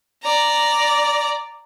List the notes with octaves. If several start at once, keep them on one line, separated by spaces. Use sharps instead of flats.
D5 A#5